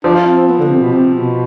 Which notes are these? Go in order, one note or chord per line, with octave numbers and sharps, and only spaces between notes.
F3 D4
F4
C4
C4
B3
D3
C3
B2
C3
B2